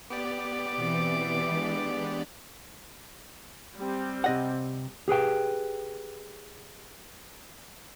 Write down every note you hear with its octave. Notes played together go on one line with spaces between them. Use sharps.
B3 G4 D5 D6
B2 E3 C4
G#3 D4
G3 C4
C3 D#5 F#5
G4 G#4 B4 G5